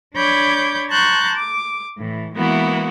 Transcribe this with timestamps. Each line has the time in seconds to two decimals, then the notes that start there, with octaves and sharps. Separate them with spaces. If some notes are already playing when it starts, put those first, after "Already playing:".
0.14 D4 C#5 B5 D6 G6 G#6
0.89 A5 A#5 C6 C#6 F#6 G6
1.35 D6
1.98 A2 E3
2.34 E3 G#3 A#3 B3 E4 F#4